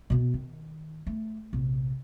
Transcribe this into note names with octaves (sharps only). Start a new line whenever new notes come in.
B2 B3
D#3
A3
A#1 C3